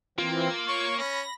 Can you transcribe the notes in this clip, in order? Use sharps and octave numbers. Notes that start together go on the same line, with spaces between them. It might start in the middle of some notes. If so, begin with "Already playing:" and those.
E3 A#3 C4 F4
C#5 C#6
C#4 B5 A#6